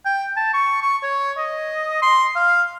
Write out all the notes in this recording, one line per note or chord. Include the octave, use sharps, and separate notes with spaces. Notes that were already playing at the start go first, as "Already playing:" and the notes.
G5
A5
C#6
C#6
C#5
D#5
C6
F5